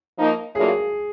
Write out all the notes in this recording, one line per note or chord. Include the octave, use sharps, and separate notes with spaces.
F3 A#3 D#4
A2 F#3 A#3 D4 F4 G#4